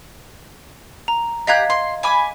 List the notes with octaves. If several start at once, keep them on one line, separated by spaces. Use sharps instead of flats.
A#5
G4 D#5 F5 A#5 F#6 G#6
C6
G#5 B5 D6